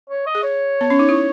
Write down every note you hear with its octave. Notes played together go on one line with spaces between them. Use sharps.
C#5
D#5
G#4
C#5
B3
C#4
D#4
E4